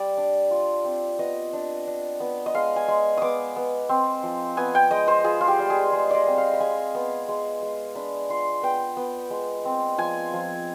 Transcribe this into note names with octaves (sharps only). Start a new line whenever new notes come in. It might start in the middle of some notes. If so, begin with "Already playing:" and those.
Already playing: G3 D5
D4
F4
C4
B3 D#5
D4
D4
B3
D#5
G#3 F5
G#5
G#3
B3 D6 D#6
B3
C4
F3
B3 G#5
G5
G#3 D#5
C5
F4 G#4
F4
G4
G3
G#4
G#3
D5 D#5
C4
F5
B5
G#3 G#5
B3
G#3
G#3
D4 B5
F4 C6
B3 G5
B3
G#3
C4
F3 G#5
F3